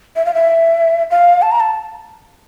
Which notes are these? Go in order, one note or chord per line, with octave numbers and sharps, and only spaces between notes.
E5
F5
E5
F5
A5
A#5
A5